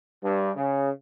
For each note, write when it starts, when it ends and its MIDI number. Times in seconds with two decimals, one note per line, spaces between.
0.22 0.49 43
0.55 0.89 49